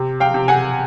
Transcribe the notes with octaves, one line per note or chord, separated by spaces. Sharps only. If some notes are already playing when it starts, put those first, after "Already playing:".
Already playing: C3
F5 G5
C3
F#5 G#5